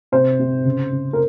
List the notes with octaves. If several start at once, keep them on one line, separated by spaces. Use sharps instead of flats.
C3 C5
C3
C#3
C#3
A#4